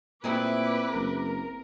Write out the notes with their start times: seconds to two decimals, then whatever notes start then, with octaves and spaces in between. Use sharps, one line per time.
0.24 A#2 A3 C4 E4 G#4 B4 D6
0.94 F#1 A#4